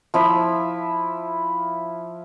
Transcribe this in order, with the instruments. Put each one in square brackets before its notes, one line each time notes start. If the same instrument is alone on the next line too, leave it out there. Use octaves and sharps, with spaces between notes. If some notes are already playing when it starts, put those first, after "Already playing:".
[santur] F3 E4 E5